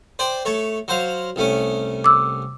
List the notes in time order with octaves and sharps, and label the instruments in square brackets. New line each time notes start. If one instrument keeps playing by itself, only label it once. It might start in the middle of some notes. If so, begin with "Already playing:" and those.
[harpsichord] C5 D5 G5
A3 C#5 A5
F#3 C5 F5
C2 A3 C#4
[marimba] D6 E6